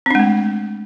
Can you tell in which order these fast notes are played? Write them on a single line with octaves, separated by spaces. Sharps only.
C4 D4 G#3 A3